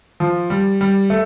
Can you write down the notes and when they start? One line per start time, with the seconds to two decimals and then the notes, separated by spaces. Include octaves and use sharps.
0.20 F3
0.50 G3
0.81 G3
1.10 A3